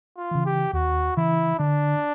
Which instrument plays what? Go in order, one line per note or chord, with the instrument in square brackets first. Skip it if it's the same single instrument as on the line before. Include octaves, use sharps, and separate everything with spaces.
[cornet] F4
[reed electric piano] C#3 E3
[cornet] G4
[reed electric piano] D#2 [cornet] F#4
[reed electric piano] C#3 E3 [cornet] E4
[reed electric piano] D3 [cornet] D4